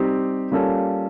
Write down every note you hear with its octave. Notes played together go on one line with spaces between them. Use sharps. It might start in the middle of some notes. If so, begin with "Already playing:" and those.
Already playing: G3 C4 D#4 G4
G3 A#3 C#4 F4 A4